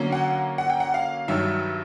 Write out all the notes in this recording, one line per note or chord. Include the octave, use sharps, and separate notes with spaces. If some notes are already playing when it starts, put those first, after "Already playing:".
Already playing: D3 F#3 A#3 C#4
F#5
F#5
G5
F#5
F5
G2 D#3 F#3 E5